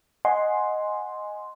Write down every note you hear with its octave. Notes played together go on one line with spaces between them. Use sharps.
D#5 F#5 G#5 C6